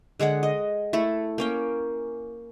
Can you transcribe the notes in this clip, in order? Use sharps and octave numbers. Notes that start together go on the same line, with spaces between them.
D3 G#3 G#4 F#5
D#5
A3 E4 A4
A#3 C#4 G5